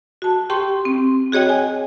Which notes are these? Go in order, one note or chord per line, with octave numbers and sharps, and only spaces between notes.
F#4 A5
G4 G5 C6 C#6
C4
F#4 G#4 C#5 D#5 G5
G#5